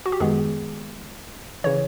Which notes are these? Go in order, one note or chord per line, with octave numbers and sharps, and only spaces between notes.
F#4
G4
F#2 D#3 G#3 B3 G#4
C#3 E3 C#5